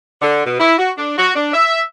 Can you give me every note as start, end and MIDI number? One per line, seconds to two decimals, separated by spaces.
0.22 0.43 50
0.45 0.59 47
0.59 0.74 64
0.78 0.91 66
0.97 1.14 62
1.18 1.34 66
1.36 1.52 62
1.53 1.81 76